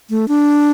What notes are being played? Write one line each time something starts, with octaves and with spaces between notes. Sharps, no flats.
A3
D4